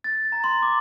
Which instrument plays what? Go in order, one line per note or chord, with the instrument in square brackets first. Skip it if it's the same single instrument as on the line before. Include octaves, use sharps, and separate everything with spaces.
[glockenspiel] A6
A#5
C6
D6